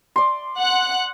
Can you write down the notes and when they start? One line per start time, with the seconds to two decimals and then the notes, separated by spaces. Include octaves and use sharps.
0.16 D5 C6
0.58 F#5 F#6